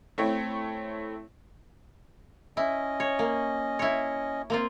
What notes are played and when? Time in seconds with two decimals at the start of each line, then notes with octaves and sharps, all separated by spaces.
0.18 A3 C4 E4 C#5
2.57 C#4 E4 D#5
3.00 C#5
3.19 A#3
3.79 E4 C#5
4.50 A#3 C4 F4